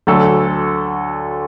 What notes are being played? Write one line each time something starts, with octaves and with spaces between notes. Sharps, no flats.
D2 D3 F#3 A3 A4